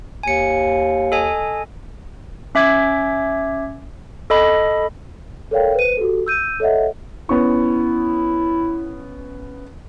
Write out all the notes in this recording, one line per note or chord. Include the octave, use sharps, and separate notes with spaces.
D#2 G#5 C#7
A4 D#5 G#5
C#4 E5 D6 G#6
A4 D#5 B5
A4 A#4 C#5 D5 F5 G5
B4 C5 D#7
F#4 G4 A4
E6 G6 D#7
A4 C#5 D#5 E5 F#5
B3 C#4 E4 C#6